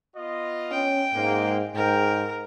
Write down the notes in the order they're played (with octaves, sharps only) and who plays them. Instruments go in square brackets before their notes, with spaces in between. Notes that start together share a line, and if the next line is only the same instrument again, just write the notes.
[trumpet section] B3 F4 D#5
[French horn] C#4 [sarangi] G5
[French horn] G#2 [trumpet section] G#3 A#3
[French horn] G#2 [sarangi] A#4 [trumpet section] G5